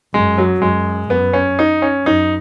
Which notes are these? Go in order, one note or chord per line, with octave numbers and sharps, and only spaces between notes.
F#2 G#3
F#3
F#2 G#3
F#2 B3
C#4
D#4
C#4
F#2 D#4